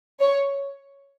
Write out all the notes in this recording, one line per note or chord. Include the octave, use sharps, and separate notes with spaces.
C#5